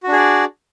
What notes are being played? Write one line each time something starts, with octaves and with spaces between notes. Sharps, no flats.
D4 F#4 G#4 D5